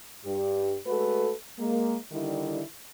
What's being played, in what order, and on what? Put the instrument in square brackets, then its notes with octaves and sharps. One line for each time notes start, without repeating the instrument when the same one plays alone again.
[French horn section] G2 G4
G#3 A3 F#4 A4 B4
G#3 A#3
D3 D#3 G3 E4